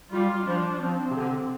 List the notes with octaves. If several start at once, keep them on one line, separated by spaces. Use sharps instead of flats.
G3 F4
F3 D4
F3 C4
C3
D3